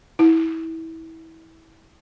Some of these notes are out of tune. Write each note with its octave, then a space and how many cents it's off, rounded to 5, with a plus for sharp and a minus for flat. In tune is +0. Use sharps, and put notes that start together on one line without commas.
E4 -25